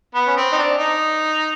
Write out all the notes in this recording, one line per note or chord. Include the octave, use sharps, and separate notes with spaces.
B3
C#4
C4
D#4
D4
D#4